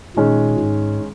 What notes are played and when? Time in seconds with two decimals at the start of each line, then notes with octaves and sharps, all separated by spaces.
0.16 A#2 D#3 G#3 C#4
0.60 G#2